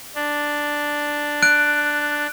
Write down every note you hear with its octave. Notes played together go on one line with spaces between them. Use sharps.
D4
F#6 D7